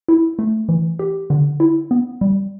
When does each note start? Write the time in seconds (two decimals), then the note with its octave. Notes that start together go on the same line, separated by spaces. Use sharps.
0.09 E4
0.39 A3
0.69 E3
0.99 G4
1.30 D3
1.60 E4
1.91 B3
2.21 G3